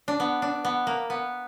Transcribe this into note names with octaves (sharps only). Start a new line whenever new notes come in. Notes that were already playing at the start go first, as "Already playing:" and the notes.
D4
B3
D4
B3
A#3
B3